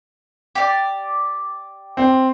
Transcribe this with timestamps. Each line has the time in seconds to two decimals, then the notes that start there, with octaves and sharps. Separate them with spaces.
0.55 G4 D5
1.97 C4